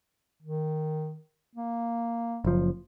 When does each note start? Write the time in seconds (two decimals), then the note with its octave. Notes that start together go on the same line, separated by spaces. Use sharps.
0.42 D#3
1.55 A#3
2.45 F#1 F3